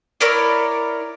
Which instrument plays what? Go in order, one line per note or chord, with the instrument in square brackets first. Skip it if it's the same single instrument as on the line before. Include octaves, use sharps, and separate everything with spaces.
[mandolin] E4 A#4 C#5 D5